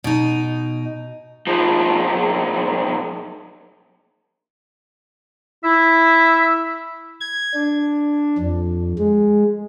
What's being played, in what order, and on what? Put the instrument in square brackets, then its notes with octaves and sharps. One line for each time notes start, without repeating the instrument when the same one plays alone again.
[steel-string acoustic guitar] B2 D#4
[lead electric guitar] B1 F3
[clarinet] E4 [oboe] E5
[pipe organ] G#6
D4
F2
G#3